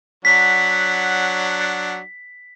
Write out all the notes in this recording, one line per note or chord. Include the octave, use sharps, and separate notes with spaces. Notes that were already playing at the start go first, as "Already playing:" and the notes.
F#3 D4 F#5 B6